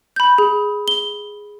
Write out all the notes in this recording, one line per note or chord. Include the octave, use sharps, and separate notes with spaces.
B5 G6
G#4
G7